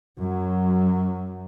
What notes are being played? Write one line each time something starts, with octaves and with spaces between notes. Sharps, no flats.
F#2 F#3